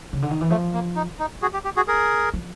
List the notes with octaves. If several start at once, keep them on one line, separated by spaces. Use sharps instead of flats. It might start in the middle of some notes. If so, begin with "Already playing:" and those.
C#3
D3
D#3
E3
F3 A3
A#3
D#4
D#4
F#4 G#4
G4
G4
F#4 G#4
G#4 A#4
F3